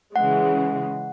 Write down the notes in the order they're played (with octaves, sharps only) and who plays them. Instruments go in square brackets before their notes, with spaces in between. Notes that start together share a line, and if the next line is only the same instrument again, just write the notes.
[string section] C#3 E3 G#3 [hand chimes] F#5